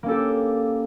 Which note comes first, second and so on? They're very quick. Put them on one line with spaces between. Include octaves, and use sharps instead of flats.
A#3 C#4 A4 G4